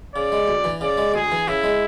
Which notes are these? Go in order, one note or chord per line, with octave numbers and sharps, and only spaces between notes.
C#3 D5
G#3
D2
E3
C#3 D5
G#3
D2 G#4
E3
C#3 E4
G#3